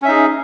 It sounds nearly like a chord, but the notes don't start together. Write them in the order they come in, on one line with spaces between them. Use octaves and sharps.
C#4 E5 D#4 G#4